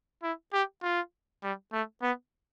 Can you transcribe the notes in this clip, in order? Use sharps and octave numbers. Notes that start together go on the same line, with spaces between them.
E4
G4
F4
G3
A3
B3